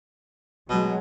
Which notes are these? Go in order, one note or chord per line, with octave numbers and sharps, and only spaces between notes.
B2 F#3 G#3